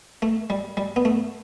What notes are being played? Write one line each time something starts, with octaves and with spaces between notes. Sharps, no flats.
A3
G3
G3
B3
A3